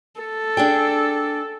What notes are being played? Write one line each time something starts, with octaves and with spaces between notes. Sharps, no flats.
A4
D4 G#4 G5